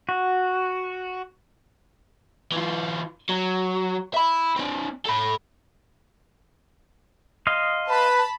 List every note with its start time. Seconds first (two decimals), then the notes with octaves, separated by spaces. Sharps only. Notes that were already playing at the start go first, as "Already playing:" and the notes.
0.09 F#4
2.52 E3 F4
3.29 F#3
4.14 E5 B5
4.56 C4 D4
5.06 A4 B5
7.47 D#5 F5 C6
7.89 B4 A5 B5